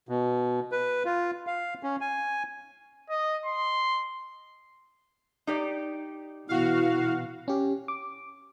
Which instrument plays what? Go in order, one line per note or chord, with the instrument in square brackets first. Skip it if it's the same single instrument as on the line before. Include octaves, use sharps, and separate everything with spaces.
[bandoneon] B2
B4
F4
F5
C#4
G#5
[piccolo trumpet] D#5
C6
[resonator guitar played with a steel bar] D#4 G4 D5
[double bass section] B2 E3 B3 [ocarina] E4 [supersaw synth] F#4 F5
[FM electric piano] C#4 G4
D6